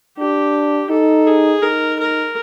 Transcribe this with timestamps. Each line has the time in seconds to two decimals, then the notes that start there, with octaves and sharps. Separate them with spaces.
0.18 D4 G4
0.90 D#4 A4
1.27 G#4
1.63 D#4 A#4
2.00 A#4